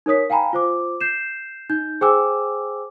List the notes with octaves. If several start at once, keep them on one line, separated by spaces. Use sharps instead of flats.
D#4 A#4 C#5 D#6 B6
F5 G5 G#5 A#5 B5
F4 C5 D6
G6 C7 E7
D#4 G6
G#4 C5 G5 G#5 D6 E6